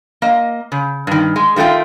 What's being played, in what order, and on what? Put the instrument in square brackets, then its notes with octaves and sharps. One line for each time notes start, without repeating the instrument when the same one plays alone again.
[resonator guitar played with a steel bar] A#3 D#5
C#3
G2 D#3
G#3
D#3 G3 A3 F4 G5